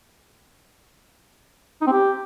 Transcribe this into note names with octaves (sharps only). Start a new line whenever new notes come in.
D#4
C4
G4